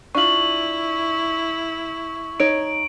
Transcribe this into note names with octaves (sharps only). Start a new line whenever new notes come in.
D4 E4 F4 C#6 F#7
D#4 C#5 D7